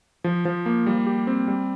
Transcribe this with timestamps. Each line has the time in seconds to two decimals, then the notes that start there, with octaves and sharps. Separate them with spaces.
0.24 F3
0.45 F3
0.66 A#3
0.87 G3
1.07 G4
1.27 C4
1.48 G3